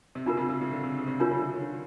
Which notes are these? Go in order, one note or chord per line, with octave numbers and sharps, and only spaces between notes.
C3
C#3 D4 F4 A#4
C3
C#3
C#3
D3
C3
C#3
C3
C#3 D4 F4 A#4 C#5
D3
C#3
D#3